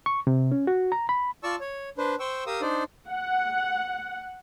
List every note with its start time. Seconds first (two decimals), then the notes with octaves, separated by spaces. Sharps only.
0.06 C#6
0.27 C3
0.52 C#4
0.67 F#4
0.92 A#5
1.09 B5
1.43 F4 D5 A5 C#6 E6
1.60 C#5
1.98 D4 B4 C5
2.20 C5 G5 C#6 E6
2.46 G4 A#4 F5 D#6 E6
2.61 D4 D#4 C5 D5
3.08 F#5